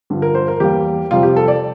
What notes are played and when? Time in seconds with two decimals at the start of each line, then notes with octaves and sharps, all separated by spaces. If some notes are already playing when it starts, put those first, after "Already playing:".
0.10 G2 D3 F3
0.22 A#4
0.35 C5
0.48 A#4
0.60 E2 E3 G3 A#3 G4
1.11 F2 C3 G3 C4 F4
1.23 G4
1.36 A4
1.48 D5